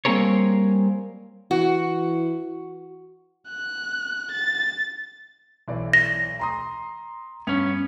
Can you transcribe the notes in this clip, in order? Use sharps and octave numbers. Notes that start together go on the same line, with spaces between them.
G3 A#3 C4 G#4 A#4 C#5
E3 F#4
F#6
A6
B1 E3 D5
A#6
A#5 C6 D#6
G2 B3 C#4 G#6 F7